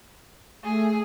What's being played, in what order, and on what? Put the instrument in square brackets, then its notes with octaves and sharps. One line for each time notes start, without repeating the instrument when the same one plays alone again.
[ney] A3 [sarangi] G#4